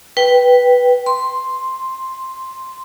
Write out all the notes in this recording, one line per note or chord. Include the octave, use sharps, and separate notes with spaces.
B4 G5
C6